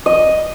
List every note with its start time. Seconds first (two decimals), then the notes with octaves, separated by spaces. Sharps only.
0.06 D#5